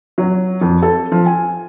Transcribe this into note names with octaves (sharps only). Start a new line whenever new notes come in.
F#3
F2
A4
F3
G#5